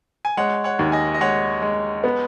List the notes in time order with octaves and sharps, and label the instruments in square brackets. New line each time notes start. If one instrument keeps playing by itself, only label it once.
[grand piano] G#5
[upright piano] G#3 [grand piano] C#5 F#5
[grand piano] C#5 F#5
[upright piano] D#2
[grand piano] D#5 G#5
D#5
[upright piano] G#3 [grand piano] C#5 F#5
[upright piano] G#3
B3